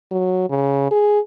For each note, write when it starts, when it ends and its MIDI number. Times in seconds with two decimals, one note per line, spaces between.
0.11 0.47 54
0.50 0.90 49
0.91 1.20 68